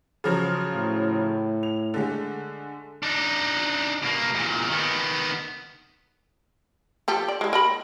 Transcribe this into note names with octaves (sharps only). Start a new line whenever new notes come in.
C#3 F3 F#3
A2
F7
D3 G#3 A3
D4 D#4
B2 A#3
E2 A#2
D#3 B3
F3 G4 A4
D5
G#3 E4
A#4 D#5 B5